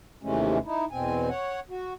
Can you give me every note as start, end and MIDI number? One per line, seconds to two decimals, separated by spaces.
0.23 0.58 39
0.23 0.58 48
0.23 0.58 52
0.23 0.58 56
0.23 0.58 57
0.23 0.58 61
0.65 0.85 63
0.65 0.85 64
0.91 1.29 40
0.91 1.29 47
0.91 1.29 60
0.91 1.29 80
1.29 1.60 73
1.29 1.60 78
1.70 1.94 66